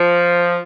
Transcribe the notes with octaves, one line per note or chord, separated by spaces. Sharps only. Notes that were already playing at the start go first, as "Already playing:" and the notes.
Already playing: F3